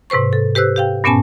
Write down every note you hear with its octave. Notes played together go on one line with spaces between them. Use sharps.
G#2 C3 B4 C5 C#6
A4
G4 B4 C5 E6 F#6
G4 F5 G5
G2 A#2 B3 C#4 G#5 A5